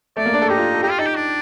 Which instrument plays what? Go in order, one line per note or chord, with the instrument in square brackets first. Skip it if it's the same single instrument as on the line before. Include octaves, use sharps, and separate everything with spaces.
[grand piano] A3 [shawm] D5
[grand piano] A#3
D4
A4
[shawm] D#4 [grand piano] G4
[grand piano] F4
A4
[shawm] D#4 [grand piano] G4
[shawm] F4
[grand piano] D#4 [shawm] A4
[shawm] G4
D4